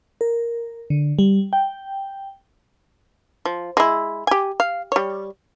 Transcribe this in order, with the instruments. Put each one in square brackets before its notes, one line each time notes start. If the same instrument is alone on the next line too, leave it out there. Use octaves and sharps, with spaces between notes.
[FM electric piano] A#4
D3
G3
G5
[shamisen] F3
G#3 E4
G4 G#5
F5
G3 C#5